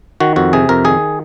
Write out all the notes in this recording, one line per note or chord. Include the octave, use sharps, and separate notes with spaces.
D#3 F#4
F2 F#4
C3 G#4
F2 A#4
D#3 G#4